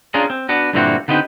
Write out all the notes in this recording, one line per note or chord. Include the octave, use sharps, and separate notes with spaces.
C#4 D4 F4 G#4 A#4
C4
B3 D4 F#4
G2 A#2 D3 E3 C4 F#4
D3 B3 C4 D#4 G4